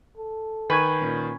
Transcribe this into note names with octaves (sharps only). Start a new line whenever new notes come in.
A4
D#3 B4 G#5 C#6 G6 G#6
A#2 C#4